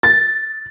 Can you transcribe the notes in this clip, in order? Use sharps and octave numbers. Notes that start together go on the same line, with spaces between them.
A6